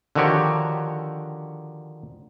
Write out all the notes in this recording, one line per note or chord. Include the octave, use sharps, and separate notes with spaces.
D3 D#3 F3 F#4 G4 C#5